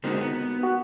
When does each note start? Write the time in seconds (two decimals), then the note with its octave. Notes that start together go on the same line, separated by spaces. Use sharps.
0.04 D3 G#3 A#3 C4 D#4 F#4
0.21 B3
0.63 F#4